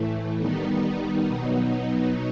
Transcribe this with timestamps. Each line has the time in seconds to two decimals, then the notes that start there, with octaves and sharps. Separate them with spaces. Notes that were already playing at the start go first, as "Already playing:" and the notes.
Already playing: A2 E3 A3
0.38 D#3 G3 B3 D#4
1.26 B2 F#3 B3 D#4